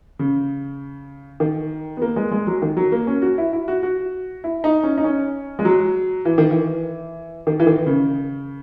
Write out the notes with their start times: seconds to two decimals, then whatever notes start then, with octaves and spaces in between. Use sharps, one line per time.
0.19 C#3
1.40 D#3
1.97 B3
2.02 A#3
2.16 G#3
2.32 G#3
2.47 F#3
2.62 D#3
2.77 F#3
2.92 A#3
3.07 C#4
3.22 F#4
3.38 E4
3.53 E4
3.68 F#4
3.83 F#4
4.44 E4
4.64 D#4
4.83 C#4
4.98 D#4
5.04 C#4
5.59 G#3
5.65 F#3
6.25 E3
6.38 D#3
6.51 E3
7.47 D#3
7.60 E3
7.67 D#3
7.87 C#3